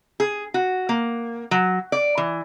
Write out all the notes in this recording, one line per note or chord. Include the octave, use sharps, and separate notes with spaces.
G#4
F#4
A#3
F#3
D5
E3